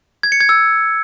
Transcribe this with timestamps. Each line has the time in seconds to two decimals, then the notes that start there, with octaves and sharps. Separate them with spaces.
0.23 G#6
0.32 C#7
0.40 G#6
0.49 E6